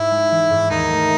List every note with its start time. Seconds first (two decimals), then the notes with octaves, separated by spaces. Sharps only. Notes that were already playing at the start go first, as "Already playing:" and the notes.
Already playing: G#2 E4
0.11 G#3
0.31 E3
0.51 G#2
0.70 D#2 D#4
0.89 A3